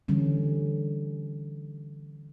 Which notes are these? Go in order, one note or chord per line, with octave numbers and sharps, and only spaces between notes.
D3 E3 G3 C#4